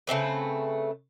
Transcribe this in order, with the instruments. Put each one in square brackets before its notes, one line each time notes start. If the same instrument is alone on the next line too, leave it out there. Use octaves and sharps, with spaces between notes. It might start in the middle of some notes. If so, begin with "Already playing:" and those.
[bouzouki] C#3 A3 C4 B4